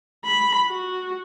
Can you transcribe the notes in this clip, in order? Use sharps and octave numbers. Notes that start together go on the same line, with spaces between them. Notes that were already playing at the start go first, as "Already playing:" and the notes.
B5
F#4